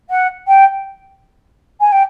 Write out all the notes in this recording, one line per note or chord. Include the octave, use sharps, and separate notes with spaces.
F#5
G5
G#5
G5